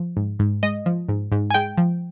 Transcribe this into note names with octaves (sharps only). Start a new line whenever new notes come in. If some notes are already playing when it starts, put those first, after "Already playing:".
Already playing: F3
G#2
G#2
G#3 D#5
F3
G#2
G#2
G#5
G#3 G5
F3